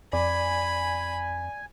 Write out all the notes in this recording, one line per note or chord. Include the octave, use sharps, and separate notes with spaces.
F2 D5 G#5 B5